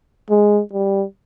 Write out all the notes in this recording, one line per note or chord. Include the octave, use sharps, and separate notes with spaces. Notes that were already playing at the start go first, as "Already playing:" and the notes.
G#3
G3